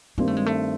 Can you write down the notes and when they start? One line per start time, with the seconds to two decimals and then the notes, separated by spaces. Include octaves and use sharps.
0.18 G2 D#3 G3 A#3 C4
0.28 A3
0.37 G#3
0.46 A3